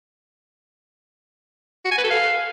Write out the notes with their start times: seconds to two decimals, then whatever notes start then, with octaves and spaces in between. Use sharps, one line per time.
1.85 F#4
1.91 G#5
1.97 B4
2.04 A4
2.10 F5